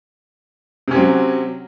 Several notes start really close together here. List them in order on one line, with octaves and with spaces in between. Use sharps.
C3 C#4 C4 F#3